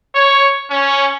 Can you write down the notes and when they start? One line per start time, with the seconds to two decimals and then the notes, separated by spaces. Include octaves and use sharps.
0.14 C#5
0.70 C#4